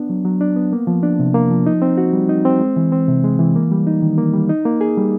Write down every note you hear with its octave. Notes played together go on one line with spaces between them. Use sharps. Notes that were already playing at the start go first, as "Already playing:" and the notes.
Already playing: B3 D4
F#3
F#3
D4
B3
A#3
F3
D4
C3
A#3
F3
D#4
C4
F#4
G3
D#4
C4
G#3
E3
C4
C3
G#3
E3
A#3
G3
D#4
D#3
A#3
G3
D#4
A#3
G#4
G3